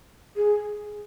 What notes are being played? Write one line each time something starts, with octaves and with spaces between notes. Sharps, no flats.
G#4